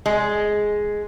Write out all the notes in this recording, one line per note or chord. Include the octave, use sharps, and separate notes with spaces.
G#3